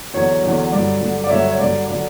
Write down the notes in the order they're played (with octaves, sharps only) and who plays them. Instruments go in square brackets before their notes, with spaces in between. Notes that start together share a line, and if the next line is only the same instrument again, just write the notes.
[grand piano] E2 D3 F#3 C#5
E2 D3 F#3
G2 D3 F#3 D5
G2 D3 F#3
D5
G2 D3 F#3 C#5 E5
C#5
G2 D3 F#3 D5
D3 F#3 D5